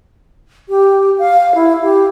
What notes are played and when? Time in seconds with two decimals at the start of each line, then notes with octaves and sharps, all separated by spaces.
0.69 G4
1.19 F5
1.55 E4
1.83 G4